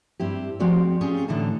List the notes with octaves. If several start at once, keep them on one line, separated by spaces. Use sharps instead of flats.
G2 C4 E4 G4
F3 G#3 C4 F#4 G4 D5
C4 C#4 F4 G4 G#4
A2 D3 E3 D#4 E4 A5